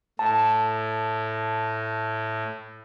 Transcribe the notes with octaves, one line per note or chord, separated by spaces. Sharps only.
A2 A5